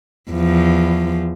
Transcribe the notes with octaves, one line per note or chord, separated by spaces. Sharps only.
E2 F3